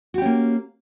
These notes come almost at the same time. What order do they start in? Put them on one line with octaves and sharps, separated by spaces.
F#4 G4 C#4 A#3